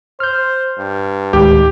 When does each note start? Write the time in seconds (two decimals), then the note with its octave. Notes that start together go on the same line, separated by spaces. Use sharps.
0.20 C5 F6 G6
0.79 G2
1.33 D2 A2 D#3 G#3 G4